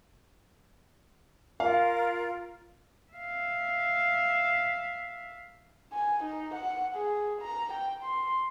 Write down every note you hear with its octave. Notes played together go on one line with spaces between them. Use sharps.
F4 A#4 F5
E5 F5
G#5
D#4
F#5
G#4
A#5
G5
C6